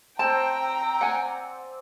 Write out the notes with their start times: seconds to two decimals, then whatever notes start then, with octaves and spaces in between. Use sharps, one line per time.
0.19 C4 G5 A5 A#5
1.01 D5 F#5 G#5